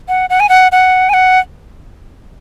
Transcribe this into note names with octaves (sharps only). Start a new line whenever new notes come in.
F#5
F#5
G#5
F#5
F#5
G#5
F#5